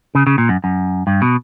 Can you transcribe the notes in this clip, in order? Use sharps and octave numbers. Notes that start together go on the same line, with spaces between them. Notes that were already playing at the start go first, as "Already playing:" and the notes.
C#3
C#3
A#2
F#2
F#2
G2
B2